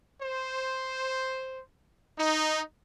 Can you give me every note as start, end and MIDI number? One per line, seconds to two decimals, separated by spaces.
0.22 1.60 72
2.18 2.60 63